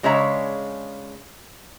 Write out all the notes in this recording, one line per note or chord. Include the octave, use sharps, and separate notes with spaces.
C#3 G#3 D4 C#5 E5 A#5